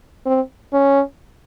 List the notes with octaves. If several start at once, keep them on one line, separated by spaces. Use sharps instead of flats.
C4
C#4